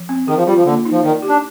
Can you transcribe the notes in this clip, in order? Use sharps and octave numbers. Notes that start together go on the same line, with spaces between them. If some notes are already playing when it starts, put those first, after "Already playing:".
Already playing: F3
C4
D#3 G#4
F3
G3 F4
F3
D3 A#3
D#4
F3
D#3 D5
G4
D4